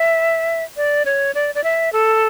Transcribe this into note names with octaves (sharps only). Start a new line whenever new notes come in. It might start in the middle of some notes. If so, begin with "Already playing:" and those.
Already playing: E5
D5
C#5
D5
D5
E5
A4